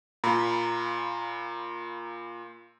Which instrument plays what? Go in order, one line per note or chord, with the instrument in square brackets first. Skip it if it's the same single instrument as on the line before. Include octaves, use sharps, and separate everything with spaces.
[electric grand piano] A#2 F4 [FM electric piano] A#5 B5